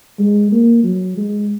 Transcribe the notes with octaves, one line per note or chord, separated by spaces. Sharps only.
G#3
A#3
F#3
G#3